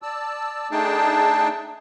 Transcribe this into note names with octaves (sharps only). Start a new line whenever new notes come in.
D5 A5 E6
A3 D4 D#4 G#4 G5 A5